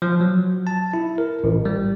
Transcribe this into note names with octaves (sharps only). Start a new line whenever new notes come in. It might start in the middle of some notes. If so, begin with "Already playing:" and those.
F3
F#3
A5
E4
A#4
A1
G3